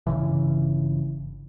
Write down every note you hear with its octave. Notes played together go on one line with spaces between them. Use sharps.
G1 D#2 C#3 E3